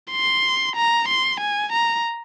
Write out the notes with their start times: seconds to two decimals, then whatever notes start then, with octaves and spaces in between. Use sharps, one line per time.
0.11 C6
0.76 A#5
1.08 C6
1.40 G#5
1.72 A#5